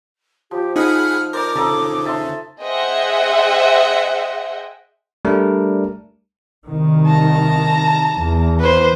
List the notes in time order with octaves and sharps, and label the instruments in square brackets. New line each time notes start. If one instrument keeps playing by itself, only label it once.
[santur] F3 [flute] G4
[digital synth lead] D#4 [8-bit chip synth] G#4 F#5 B5 [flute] F6
[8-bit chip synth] A#4 [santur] C5 D5 A#5 [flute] D6
[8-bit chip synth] C#3 [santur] A4 A#5 D#6
[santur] E5 A5 C6
[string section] G#4 C5 D#5 E5 F#5 G5
[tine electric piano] G3 A3 D4 A#4
[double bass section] C2 D#3
[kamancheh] A5 A#5
[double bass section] E2
[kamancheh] B4 C5